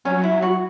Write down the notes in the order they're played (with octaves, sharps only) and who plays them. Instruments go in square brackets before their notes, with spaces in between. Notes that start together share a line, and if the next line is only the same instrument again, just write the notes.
[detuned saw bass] F#3 [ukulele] C#4
[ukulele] E4
F#4